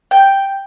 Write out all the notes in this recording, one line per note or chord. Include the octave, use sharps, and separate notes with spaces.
G5